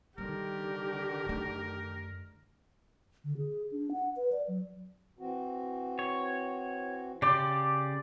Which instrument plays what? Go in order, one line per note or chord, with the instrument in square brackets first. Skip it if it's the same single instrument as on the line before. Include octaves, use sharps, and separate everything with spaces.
[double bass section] D3 D#3 [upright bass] G3 [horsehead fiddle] G4 [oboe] A#4
[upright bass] F#2 A3
[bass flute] D3
G#4
D4
F#5
B4
D5
F#3
[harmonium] E3 C4 F#4
[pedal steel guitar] C#5
[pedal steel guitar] C#3 G4 C6 [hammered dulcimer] D5